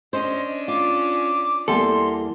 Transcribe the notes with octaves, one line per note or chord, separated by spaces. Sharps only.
C#4 D4 C5 D#5
F4 D6
E2 G3 A#3 A4 C6